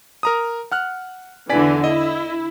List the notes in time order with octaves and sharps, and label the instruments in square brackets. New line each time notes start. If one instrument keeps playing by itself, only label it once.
[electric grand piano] A#4 A#5 D#6
F#5 F6 F#6
[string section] E2 D3 E3 [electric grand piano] D5 G#5 B6
[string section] E4 [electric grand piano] D#5